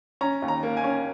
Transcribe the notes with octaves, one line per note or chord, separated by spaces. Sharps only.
C#4 A#5
D#2
A#5
A#3
G#5
C#4